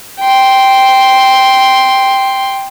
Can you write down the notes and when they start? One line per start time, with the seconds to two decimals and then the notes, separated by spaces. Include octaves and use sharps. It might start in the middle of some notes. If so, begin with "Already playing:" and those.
0.20 G5 C6